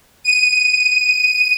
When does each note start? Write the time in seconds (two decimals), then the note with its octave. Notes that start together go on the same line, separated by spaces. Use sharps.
0.24 D#7